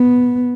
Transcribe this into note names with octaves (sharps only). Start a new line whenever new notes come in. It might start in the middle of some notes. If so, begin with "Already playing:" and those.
Already playing: B3